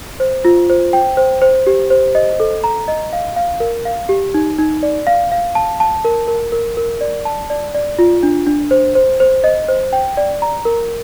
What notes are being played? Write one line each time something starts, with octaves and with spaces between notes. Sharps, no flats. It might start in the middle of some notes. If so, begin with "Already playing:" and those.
C5
F4
C5
G5
C5
C5
G4
C5
D#5
A4
A#5
D#5
F5
F5
A#4
F5
G4
D#4
D#4
D5
F5
F5
A5
A5
A#4
A#4
A#4
A#4
D5
A5
D5
D5
F4
D4
D4
C5
C5
C5
D#5
C5
G5
D5
A#5
A#4